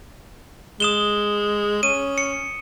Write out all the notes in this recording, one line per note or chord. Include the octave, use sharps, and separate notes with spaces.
G#3 D#6 E7 G7
C#4 D#7
C#7